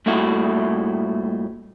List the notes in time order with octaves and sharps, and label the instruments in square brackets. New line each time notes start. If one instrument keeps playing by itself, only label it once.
[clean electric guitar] G2 A#2 A3 E4 F#4